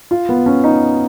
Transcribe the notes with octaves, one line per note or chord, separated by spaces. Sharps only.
F4
B3
C#4
D#4